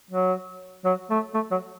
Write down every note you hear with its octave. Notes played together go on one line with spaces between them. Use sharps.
F#3
F#3
A3
A3
F#3